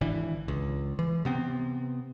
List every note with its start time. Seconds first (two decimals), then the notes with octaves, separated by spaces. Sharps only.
0.01 G#1 D3 E3
0.48 C#2
0.99 E3
1.25 C3 B3 C4